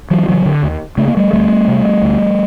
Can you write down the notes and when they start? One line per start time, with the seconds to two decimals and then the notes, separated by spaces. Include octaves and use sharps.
0.11 E3 F#3
0.28 C#3 E3 F#3
0.46 D3
0.63 D#2
0.97 C#3 A3
1.08 A#3
1.17 G3 A3
1.33 D2 G3 A3
1.68 C3
2.03 D2